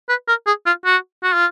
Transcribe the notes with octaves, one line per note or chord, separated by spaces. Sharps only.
B4
A#4
G#4
F4
F#4
F#4
F4